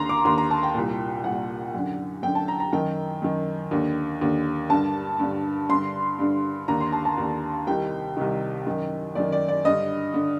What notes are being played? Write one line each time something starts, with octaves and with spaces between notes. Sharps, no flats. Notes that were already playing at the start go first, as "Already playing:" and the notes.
Already playing: D#2 D3 A#5 C6
D6
D#2 D3 C6
A#5
A5
G5
C2 A#2
C2 A#2 F#5
F#2 D3
F#2 D3 G5
A5
A#5
A#5
F#2 D#3 G5
F#2 D#3
D#2 D3
D#2 D3
G2 D3 A5
G2 D3
G2 D3 C6
G2 D3
D#2 D3 A#5
C6
A5
A5
D#2 D3
C2 C3 D#3 G5
C2 C3 D#3
F#2 D#3
F#2 D#3 D5
D5
D5
G2 D3 D#5
D3